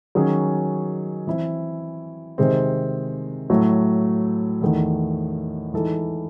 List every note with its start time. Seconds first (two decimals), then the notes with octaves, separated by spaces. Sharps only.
0.15 D#3 F#3 C#4 G#4
1.27 E3 C4 E4
2.38 C3 D#3 G#3 C4
3.50 A2 F#3 A3
4.61 E2 D#3 A3
5.73 E3 G#3 D#4 A4